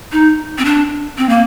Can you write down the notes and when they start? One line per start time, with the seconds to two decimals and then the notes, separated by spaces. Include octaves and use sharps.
0.12 D#4
0.58 C4
0.65 D4
1.18 C4
1.29 A#3